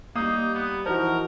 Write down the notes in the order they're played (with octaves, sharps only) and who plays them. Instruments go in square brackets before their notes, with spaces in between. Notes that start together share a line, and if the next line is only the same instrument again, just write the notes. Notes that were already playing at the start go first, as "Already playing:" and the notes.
[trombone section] G3 [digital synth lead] A#3 [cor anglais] D#4 [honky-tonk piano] D#6
[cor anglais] B3
[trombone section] E3 D#4 F#4 [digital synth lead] F3 [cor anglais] A#4